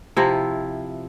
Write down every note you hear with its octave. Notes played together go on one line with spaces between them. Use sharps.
C3 F3 E4